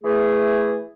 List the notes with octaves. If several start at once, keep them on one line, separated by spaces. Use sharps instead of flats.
E3 A3 G#4